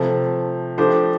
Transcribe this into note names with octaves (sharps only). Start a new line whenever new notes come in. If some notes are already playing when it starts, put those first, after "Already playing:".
Already playing: C3 F3 A3
F3 A3 D4 G4 C5